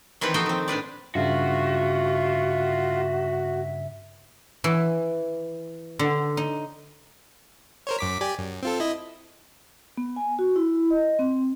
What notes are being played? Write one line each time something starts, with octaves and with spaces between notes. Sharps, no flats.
D#3 E3 C4 G4 B4
F3 D#4 F#4 A4 C5 G5
D#3 C4
A2 D4 B4 D5
G2 C#3 F4 F#4 E5
E3
D3
D#4
A#4 C5 C#5
F#2 D6 B6
G4 D5 G#5
F#2
C4 F4 A4
E4 D#5
B3
G#5
F#4
E4
D#5
C4